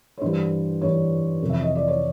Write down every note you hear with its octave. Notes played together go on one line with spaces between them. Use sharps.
C#5
G2 E3 G3 C5
G2 E3 G3 C#5
F2 C3 E3
E5
D#5
D5
C#5